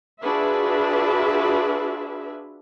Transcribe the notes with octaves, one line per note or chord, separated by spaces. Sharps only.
D4 F4 F#4 G#4 B4 E5